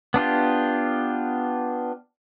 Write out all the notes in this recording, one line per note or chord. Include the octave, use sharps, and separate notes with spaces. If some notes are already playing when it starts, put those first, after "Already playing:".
B3 D4 F4 G4